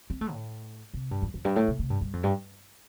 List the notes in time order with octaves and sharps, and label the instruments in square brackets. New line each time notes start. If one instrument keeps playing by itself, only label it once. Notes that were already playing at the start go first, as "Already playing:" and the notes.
[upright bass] C4
A3
A2
C3
G2
F2
F2
G2
A2
C3
C3
G2
G2
F2
G2